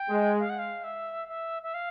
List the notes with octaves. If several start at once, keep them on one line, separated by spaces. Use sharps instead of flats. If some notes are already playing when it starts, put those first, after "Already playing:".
Already playing: G5
G#3
F5
F#5
F5
E5
E5
E5
F5